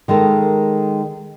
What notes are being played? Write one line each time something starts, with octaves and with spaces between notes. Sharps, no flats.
D#3 G#3 A4 A#4